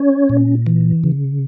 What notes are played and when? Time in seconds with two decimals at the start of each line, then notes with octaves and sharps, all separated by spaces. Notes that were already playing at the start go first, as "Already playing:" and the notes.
Already playing: C#4 C#5
0.29 A#2
0.67 E3
1.03 C#3